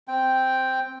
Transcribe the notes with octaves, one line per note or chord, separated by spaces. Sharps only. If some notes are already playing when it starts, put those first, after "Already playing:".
C4 G5